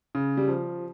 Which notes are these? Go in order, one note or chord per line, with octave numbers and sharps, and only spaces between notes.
C#3
G3
F3